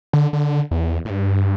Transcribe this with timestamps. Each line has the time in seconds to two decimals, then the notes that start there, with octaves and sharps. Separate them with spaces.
0.13 D3
0.33 D3
0.71 E2
1.05 A2
1.10 G2